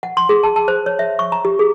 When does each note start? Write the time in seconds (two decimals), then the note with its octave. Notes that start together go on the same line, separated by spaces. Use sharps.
0.03 F#5
0.17 C6
0.29 G#4
0.43 A5
0.56 A5
0.68 C5
0.86 C#5
0.99 E5
1.19 C#6
1.32 A#5
1.45 G4
1.59 G#4